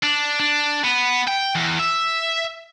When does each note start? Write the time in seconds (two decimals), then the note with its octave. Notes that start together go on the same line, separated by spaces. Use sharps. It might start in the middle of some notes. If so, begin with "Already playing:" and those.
0.03 D4
0.40 D4
0.84 B3
1.28 G5
1.56 E2
1.80 E5